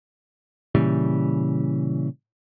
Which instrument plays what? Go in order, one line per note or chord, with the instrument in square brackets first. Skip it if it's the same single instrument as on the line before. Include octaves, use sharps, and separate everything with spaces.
[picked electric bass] A#2 C#3 E3 G3